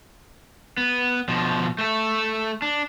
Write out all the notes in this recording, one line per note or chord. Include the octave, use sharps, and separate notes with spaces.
B3
B2 F3
A3 A4
D4